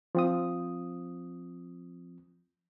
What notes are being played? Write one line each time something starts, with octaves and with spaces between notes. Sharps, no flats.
F3 C4 D#6